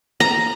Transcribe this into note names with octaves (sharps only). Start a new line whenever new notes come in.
A#5